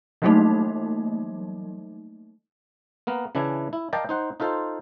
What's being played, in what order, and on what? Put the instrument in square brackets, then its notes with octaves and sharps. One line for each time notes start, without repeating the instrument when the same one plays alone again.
[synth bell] E3 F#3 G3 A3 A#3 D#4
[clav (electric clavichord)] A#3 B3 A#4
C#3 E3 D4 E4 G#5
E4
A#4 D5 D#5 F5 G5 A5
D#4 C5 F#5
D#4 F4 A4 C5